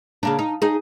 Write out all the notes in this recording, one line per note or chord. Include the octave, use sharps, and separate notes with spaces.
C#3 A#3 D4
D#4
D#4 G#4